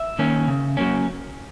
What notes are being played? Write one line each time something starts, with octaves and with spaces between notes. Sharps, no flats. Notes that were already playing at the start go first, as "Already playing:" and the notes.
Already playing: E5
D#3 A#3 C#4
C#3
F#3 A#3 C#4